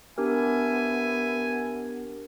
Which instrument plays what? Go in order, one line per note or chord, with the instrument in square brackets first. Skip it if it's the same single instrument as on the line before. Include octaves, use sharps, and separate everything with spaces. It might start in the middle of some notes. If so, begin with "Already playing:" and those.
[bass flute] B3 [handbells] D4 G4 A#4 [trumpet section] E5 G#5